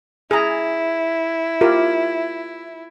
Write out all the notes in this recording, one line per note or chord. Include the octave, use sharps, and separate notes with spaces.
E4 G#4 A#5
F4 G4 A#4